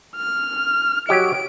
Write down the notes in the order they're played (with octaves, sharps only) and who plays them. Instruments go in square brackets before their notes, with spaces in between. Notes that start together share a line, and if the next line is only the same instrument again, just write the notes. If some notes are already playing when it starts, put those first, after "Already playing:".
[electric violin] F6
[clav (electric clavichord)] F#3 G4 D#5 [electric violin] D7